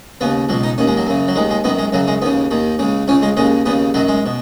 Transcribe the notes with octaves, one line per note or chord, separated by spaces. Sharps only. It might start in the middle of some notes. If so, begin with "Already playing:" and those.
D#2 C#3 B3
C#2 B2 F#3
D#4
D#2 D#3 C#4
G#3
F#3
F#2 C#3
F#3
D#2 D#3 G#3
G#3
F#2 D#3 B3
G#3
F#2 C#3 F#3
G#3
D#2 C#3 B3
D#2 D#3
C#2 C#3
C#2 C#3 C#4
G#3
D#2 C#3 G#3
D#2 C#3 B3
F#2 D#3 F#3
G#3
B2